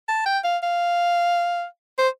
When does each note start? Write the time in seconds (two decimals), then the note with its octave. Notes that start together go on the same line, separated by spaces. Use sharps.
0.08 A5
0.26 G5
0.44 F5
0.63 F5
1.98 C5